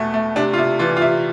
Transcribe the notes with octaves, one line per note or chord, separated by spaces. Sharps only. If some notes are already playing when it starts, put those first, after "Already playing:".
Already playing: E2 B2 A3
A3
C3 D4
F4
C3 E4
E3 F4
F4
C3 E4